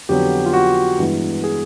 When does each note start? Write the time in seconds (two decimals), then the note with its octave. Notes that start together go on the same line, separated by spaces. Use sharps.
0.09 F2 D3 F#3 B3 G4
0.46 F4
0.54 F#4
0.99 G2 E3 G#3 B3
1.44 G#4